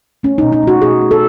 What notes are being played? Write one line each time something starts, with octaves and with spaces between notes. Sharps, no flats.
A3 C#4
D#4
B2
D#4
A3 F#4
B2 G#4
A3
A4